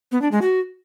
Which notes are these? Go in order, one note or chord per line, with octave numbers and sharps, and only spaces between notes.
B3
D4
G#3
F#4